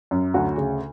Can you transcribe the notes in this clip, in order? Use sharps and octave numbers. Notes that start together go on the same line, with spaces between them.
F#2
D2 F#4
C#3